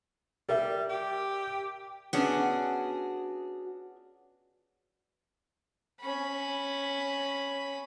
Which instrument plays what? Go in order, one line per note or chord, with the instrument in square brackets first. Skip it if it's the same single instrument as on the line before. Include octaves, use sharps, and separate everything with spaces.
[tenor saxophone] G3 [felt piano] A#4 E5
[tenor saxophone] G4
[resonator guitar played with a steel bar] B3 C#4 D4 [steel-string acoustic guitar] F#4 G#4
[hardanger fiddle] C#4 B5